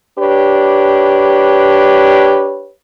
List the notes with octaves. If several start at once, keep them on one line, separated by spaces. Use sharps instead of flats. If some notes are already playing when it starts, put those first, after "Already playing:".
D4 G4 B4 C#5